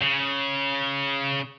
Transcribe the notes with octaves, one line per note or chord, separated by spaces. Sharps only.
C#3